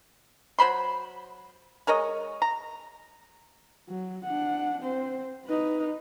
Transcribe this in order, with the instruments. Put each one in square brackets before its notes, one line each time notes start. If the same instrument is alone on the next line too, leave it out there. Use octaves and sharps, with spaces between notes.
[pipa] F#3 C5 B5 C6
G#3 A#4 C#5 D#5
A#5
[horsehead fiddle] F#3
D4 F#5
C4 C5
D#4 B4